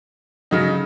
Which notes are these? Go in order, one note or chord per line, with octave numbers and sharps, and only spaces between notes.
C#3 F#3 D#4